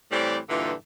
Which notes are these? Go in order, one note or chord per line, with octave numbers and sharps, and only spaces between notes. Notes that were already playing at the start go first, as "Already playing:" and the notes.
A2 E3 G3 C4 G4 D5
G2 A#2 D3 E3 D#4 F4